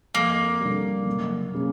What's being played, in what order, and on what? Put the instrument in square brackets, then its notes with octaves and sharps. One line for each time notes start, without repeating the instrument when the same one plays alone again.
[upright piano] F2 [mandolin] A#3
[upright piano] D3 G3
F#1
C#3